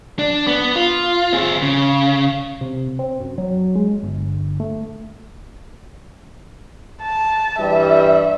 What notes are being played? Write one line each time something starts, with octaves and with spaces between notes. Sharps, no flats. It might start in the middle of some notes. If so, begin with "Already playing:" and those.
D4
B3
F4
C4 G#4
C#3
C3
C4
F#2
F#3
G#3
G1
A3
A5
G2 E3 G3 E5